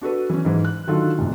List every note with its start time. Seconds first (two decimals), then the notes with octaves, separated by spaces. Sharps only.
0.02 D4 F#4 A4 B4
0.30 E3 C#4
0.45 G#2 E3
0.65 F#6
0.87 D3 D#3 F#3 F4 A4
1.19 F1 A#1